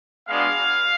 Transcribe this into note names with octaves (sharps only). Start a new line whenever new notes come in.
G#3 B3 D4 F#4 F5